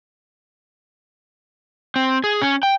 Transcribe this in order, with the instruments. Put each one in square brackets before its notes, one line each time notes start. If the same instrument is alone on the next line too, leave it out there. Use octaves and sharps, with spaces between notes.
[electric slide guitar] C4
G#4
C#4
G5